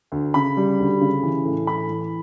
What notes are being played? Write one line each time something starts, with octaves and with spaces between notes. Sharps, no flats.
D2
C#3 B5
G3
D2
C#3
E3
A2
E3 B5
E3